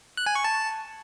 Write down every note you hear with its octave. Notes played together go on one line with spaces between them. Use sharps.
F#6
G#5
C#6
A5